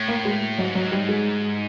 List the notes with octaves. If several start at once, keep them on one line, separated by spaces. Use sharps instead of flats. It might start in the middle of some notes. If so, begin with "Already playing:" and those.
Already playing: A2
A#3
G#3
G#2 F#3
F#3
G3
G#3